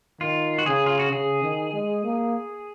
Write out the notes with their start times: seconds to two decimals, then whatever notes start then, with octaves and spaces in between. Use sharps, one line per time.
0.21 D#3 F4
0.59 F#4
0.66 C#3 G#4
0.86 F4
0.99 F#4
1.12 C#3 G#4
1.43 D#3
1.73 G#3
2.04 A#3